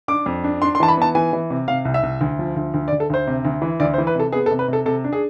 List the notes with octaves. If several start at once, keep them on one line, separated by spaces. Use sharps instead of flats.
D4 D6
F2
D4
D4 C6
C6
E3 A5
B5
B3 A5
E3 G#5
E3
C3
C3 F5
C2
E5
C2
D2
F3
D2
D2
D5
D2
A4
D2 C5
C3
D2
E3
D2 D5
C5
E3
B4
C3 A4
B3 G#4
A4
C3
B4
C3 A4
C3 A4
D4
G#4